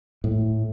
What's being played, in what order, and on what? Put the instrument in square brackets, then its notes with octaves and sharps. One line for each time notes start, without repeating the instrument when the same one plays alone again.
[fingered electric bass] A2